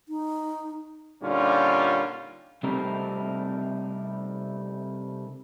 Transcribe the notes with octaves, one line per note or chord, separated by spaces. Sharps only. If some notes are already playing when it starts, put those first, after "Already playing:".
D#4
A#2 D3 G3 C#4 D#4 F4
C3 G3 A3 C4 D#4 A#4